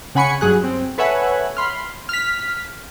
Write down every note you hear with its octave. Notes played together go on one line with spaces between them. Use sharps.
C#3 F#5 G#5 B5 C#6 C#7
G2 F#3 G#4 F#6
C4
A4 B4 C#5 E5 F#5 G#5
B5 C6 F6
F6 B6